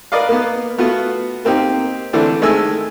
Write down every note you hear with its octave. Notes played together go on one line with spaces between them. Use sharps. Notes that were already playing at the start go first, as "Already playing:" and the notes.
A#4 B4 D5 D#5 F5
A#3 B3
A3 B3 F4 F#4
A#3 C4 D#4 G4
D3 E3 A3 C4 D4
D#3 G#3 A3 G#5 E6